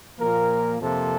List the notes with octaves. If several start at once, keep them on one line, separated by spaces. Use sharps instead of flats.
A#2 F3 A#3 A#4
F2 C3 F3 A#3 A4